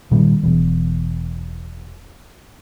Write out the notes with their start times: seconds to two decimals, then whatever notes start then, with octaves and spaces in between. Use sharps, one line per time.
0.11 A#2 D#3 G3
0.43 E1 E2